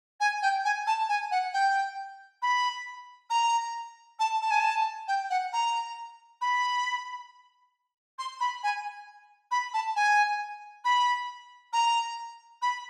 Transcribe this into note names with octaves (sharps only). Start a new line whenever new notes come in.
G#5
G5
G#5
A5
G#5
F#5
G5
B5
A#5
A5
A5
G#5
A5
G5
F#5
A#5
B5
C6
B5
G#5
B5
A5
G#5
B5
A#5
B5